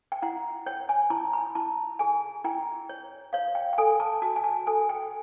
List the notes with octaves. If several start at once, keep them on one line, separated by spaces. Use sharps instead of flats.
G5
E4 F#5
C#5 G5
G#5
E4 A5
B5
E4 A5
G#4 G#5
E4 G5
C#5
C#5 F5
G5
G5
A4 G#5
A5
F#4 A5
G#5
A5
A4 G#5
G5